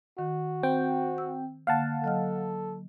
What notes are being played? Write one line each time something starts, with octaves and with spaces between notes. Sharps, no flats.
D#3 F#4
C4 G5
E6
D3 A#3 F5 F#5 A5
F#3 A4 D#5 F6